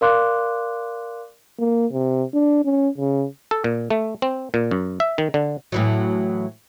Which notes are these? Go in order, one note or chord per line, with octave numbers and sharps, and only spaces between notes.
A#4 D5 F5 C6 D6 F#6
A#3
C3
D4
C#4
C#3
A4
A#2
A3
C4
A#2
F#2
E5
D#3
D3
A2 E3 F#3